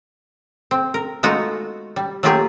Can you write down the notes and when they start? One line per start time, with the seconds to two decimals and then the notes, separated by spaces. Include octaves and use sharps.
0.71 C4
0.94 A#4
1.23 G#3 A3 B3 D#4 F4 F#4
1.96 G3
2.23 F#3 A3 A#3 F4 G4 G#4